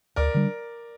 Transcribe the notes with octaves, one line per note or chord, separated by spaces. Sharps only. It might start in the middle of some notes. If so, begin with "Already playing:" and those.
D2 A#4 D5
D3 G3 D4